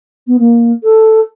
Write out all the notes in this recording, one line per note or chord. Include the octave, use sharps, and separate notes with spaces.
B3
A#3
A4